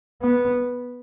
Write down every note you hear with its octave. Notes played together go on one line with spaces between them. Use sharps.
B3